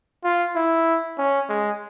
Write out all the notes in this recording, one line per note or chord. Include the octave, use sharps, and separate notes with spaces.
F4
E4
C#4
G#3